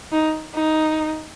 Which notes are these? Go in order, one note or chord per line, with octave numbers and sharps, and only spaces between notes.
D#4
D#4